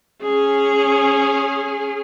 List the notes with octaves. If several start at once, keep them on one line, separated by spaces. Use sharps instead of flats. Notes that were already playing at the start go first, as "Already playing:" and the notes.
C#4 G#4